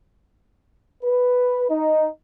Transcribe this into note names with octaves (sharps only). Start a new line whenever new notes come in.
B4
D#4